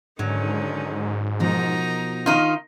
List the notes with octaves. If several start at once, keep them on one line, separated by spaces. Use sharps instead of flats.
G#2 D3 D#3 F#3 C#4
B2 F3 D#4 F#4 A#4 A#5
D#3 D#4 F4